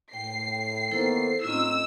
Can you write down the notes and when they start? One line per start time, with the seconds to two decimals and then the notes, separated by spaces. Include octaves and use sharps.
0.13 A2 G5 C7
0.91 D#3 A#3 B3 E4 A4 C5
1.44 A2 C4 C#4 D#4 F4 E6